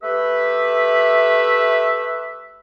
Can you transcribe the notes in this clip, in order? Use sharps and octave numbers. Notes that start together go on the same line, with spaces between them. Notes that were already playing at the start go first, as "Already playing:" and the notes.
A3 G4 B4 E5